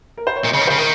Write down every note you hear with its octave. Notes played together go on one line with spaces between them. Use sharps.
A#4
C5
C#5
A#2 D#5
C#3 C#5
D#3
C#3 C5
D#3 A#4